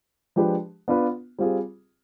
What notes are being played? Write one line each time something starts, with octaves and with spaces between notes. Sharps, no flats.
F3 G#3 D4 G4 B4
B3 D4 F4 B4
G3 C4 F4 G#4